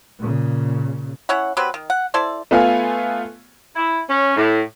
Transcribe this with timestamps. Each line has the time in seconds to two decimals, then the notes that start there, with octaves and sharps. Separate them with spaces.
0.18 A#2 C#3
1.29 C#4 E4 C#5 F#5
1.57 F#3 C4 G4 B4
1.74 D#3
1.90 F#5
2.14 E4 A4 C5 D5
2.51 A3 B3 F4 F5 G#5
3.76 E4
4.09 C#4
4.36 A2